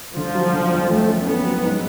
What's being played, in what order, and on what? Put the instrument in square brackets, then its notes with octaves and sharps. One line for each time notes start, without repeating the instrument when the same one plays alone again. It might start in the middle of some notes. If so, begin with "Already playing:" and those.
[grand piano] D3 [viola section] F3
[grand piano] F#3
D3
F2
[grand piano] F2 [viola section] A3
[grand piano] C#4
[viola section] B3 [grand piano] C#4
[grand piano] F#3
G#2